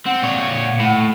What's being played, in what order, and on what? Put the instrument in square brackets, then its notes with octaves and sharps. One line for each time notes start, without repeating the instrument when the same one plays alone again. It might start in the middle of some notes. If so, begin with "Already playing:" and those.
[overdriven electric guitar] C4 [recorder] F#5
[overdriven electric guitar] A#2 C#5
A2